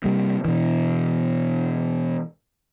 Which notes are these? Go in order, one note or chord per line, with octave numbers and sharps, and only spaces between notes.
C3 G3 A#3
B2 E3